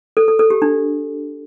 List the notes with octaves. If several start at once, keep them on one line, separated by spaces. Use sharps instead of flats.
A4
A4
A4
G4
D4